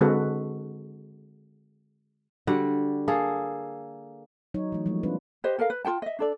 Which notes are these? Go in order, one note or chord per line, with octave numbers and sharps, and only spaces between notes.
D3 G#3 C4 F#4 A4 B4
D3 G3 F#4 F#5
A#3 G#4 A4
F#3 D#4 C#5
E3 A3
F3 G3 G#3 A#3
C4 D4 F4 B4
G4 B4 C5 D#5
A4 A#4 D#5 F5
B4
F4 A4 G5 A5
D#5 E5
D4 A4 D5